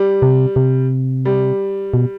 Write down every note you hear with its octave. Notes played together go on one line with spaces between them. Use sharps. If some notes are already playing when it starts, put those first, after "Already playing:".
Already playing: G3
C3
C3
G3
B2